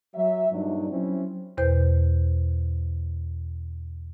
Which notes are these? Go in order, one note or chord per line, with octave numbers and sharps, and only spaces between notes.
F#3 E5
G2 A#2 F#3 D4 D#4
F#3 C4 C#4 E4
E2 B2 B4 C5 G6